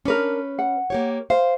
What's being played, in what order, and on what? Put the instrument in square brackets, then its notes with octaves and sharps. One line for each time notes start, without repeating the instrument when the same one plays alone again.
[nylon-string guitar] C#4 B4 [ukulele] D4 A#4
[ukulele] F#5
[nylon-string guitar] A#3 G4 C#5
[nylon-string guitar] C5 [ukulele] F5